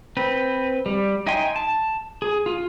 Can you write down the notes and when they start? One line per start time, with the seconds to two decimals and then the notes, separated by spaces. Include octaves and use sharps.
0.17 C4 B4
0.86 G3
1.27 D#4 E5 G5 G#5 C6
1.56 A5
2.22 G#4
2.46 F4